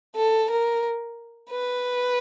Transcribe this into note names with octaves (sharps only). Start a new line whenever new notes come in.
A4
A#4
B4